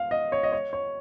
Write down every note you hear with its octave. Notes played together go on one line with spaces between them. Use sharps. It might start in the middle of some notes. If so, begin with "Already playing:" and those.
Already playing: F5
D#5
C#5
D#5
C#5
C#5